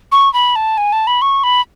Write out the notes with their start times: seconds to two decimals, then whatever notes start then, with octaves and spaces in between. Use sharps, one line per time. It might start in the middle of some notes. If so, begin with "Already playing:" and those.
0.12 C#6
0.34 B5
0.56 A5
0.78 G#5
0.93 A5
1.07 B5
1.22 C#6
1.44 B5